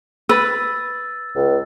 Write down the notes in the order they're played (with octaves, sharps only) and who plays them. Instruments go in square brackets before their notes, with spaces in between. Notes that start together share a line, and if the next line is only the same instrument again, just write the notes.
[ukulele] B4 [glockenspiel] E6 A6
[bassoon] C#2